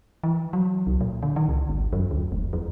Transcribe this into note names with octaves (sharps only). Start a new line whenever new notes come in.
E3
F#3
C2
A#2
D3
D#3
C#2
G#1
F#2
D2
F1
F2